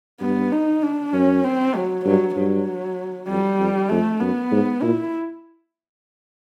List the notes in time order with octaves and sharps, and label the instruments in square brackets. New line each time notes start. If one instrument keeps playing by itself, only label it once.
[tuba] G2 [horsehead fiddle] B3
[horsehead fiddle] D#4
D4
[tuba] F#2 [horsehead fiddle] C#4
[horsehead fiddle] C4
F#3
[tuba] G2 [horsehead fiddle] F#3
[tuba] G2 [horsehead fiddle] F#3
[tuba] F2 [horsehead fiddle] G3
[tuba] F2
[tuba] F2 [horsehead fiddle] A3
[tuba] F#2 [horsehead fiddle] B3
[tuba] G#2
[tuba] A#2 [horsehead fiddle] E4